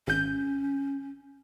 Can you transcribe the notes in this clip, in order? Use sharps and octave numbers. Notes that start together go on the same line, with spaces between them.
G#1 C#4 G6